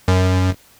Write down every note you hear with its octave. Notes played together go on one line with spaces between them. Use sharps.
F#2